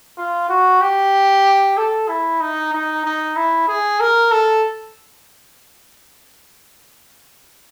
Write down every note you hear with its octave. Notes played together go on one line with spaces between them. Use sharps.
F4
F#4
G4
A4
E4
D#4
D#4
D#4
E4
G#4
A#4
A4